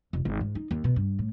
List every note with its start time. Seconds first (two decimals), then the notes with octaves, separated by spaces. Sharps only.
0.13 F1
0.25 G#1
0.41 G#2
0.55 D#4
0.71 D#2
0.84 B2
0.96 G2
1.19 A2